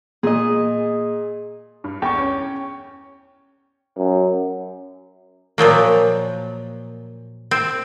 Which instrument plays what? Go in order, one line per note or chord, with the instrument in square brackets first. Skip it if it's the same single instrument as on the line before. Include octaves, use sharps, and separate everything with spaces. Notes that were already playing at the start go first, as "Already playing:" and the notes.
[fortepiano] A#2 [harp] G#4 D#5
[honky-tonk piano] G2
[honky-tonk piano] E2 [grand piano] G5 C#6
[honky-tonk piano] C#4
[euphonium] F#2
[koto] A#2 F3 F#3 A#3
C4